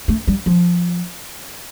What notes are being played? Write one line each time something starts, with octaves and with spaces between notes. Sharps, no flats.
A3
G3
F3